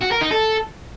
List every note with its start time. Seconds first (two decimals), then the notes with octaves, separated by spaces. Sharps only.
0.02 F#4
0.12 A#4
0.22 D#4
0.31 A4